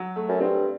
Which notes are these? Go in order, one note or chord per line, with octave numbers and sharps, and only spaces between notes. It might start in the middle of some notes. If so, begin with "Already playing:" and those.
Already playing: F#3
A3
F#2
G2 C4